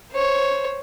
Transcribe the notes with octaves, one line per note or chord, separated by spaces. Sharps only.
C5 C#5